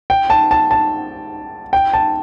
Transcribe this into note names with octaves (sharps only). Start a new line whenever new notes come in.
G5
A5
A5
A5
G5
A5